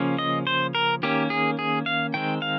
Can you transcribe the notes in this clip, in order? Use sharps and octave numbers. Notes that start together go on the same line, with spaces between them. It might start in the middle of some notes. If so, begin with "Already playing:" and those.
Already playing: C#3 F3 A#3 C#4
D#5
C5
A#4
D#3 A#3 C#4 G4
G#4
G#4
F5
D#3 G#3 C4 G5
F5